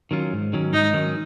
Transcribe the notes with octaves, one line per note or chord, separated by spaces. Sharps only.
D#3 F#3 C#4 F4
G#2
D#3 F#3 C#4
G#2 D#4
D#3 F#3 C#4